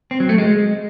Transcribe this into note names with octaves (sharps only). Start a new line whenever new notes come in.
C4
F#3
A3
G#3